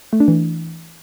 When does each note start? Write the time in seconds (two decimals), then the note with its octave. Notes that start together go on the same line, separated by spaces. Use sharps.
0.13 A3
0.20 D4
0.28 E3